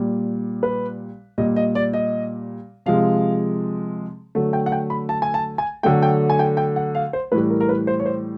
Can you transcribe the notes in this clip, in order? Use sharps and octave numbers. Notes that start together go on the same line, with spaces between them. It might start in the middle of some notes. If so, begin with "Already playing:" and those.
Already playing: A#2 G3
B4
A#2 G3 D#5
D#5
D5
D#5
C3 F3 G#3 F5
D3 F#3 A3
G5
F#5
G5
B5
A5
G#5
A5
G#5
D3 F#3 A3 G5
G5
G#5
G5
G5
F#5
F5
C5
A2 E3 G3 B4
A#4
A#4
B4
C5
C#5
C5